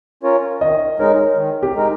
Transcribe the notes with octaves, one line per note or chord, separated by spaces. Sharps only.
C#4 F4 A#4 C#5
D#3 D#5
G#3 D#4 A#4 C#5
D#3
G4
G#3 D#4 A#4